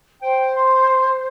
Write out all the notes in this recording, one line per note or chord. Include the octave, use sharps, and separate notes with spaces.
C5 G5
C6